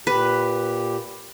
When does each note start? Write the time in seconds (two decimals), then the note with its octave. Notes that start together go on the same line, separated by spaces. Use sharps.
0.07 A#2 G4 B4